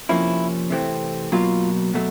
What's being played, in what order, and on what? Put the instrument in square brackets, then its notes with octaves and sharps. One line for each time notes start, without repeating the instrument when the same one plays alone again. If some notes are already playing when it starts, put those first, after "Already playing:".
[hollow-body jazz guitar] F2 C3 F3 A#3 C#4 E4
C3 E3 A3 C4
B2 F#3 A#3 F4
B2 F#3 A3